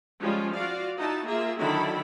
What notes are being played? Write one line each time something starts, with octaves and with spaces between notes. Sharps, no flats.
F3 G3 G#3 C#4 F4
F4 F#4 D5 F5
D#4 E4 F#4 A5
A#3 F4 G#4 E5
D3 D#3 F#3 E4 A4 B5